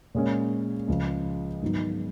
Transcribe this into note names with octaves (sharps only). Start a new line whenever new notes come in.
A#2 G#3 C#4
C#2 C#3 F3
G#2 D#3 F#3 B3 D#4